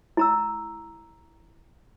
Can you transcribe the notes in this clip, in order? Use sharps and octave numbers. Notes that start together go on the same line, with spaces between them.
E4 A#5 E6